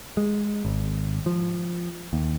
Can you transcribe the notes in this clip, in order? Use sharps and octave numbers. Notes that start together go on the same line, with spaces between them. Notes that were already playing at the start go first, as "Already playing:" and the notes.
G#3
G#1
F3
D#2